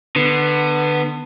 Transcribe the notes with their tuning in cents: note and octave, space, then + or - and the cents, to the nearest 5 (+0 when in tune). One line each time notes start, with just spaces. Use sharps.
D3 +25 B3 +0